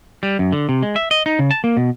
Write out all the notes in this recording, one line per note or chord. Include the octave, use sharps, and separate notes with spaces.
G3
F#2
D3
C3
G#3
E5
D#5
D#4
C#3
A5
A#3
B2